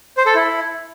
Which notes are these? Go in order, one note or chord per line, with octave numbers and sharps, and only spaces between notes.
C5
A4
E4